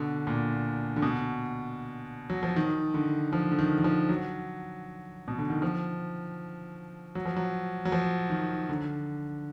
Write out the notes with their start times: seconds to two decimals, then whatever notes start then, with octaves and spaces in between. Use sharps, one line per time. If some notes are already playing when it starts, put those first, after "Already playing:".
Already playing: B2 D3
0.27 A#2
0.96 D3
1.02 B2
2.30 F#3
2.43 F3
2.56 D#3
2.94 D3
3.33 F3
3.52 D3
3.59 D#3
3.78 D#3
3.84 F3
4.09 F#3
5.28 B2
5.38 D3
5.50 D#3
5.62 F3
7.15 F#3
7.25 F3
7.36 F#3
7.85 F#3
7.92 F3
8.30 D#3
8.69 D3